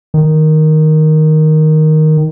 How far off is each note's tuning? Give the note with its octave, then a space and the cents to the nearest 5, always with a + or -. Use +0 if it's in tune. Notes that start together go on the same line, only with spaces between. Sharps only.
D#3 +0